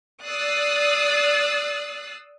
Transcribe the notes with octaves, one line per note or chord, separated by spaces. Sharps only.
D5 D#6 E6 F#6 A6 C7